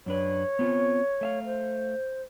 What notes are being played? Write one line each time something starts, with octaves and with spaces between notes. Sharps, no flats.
F#2 D4 B4 C#5
B3 C4 F4
A3 E5 F5
C5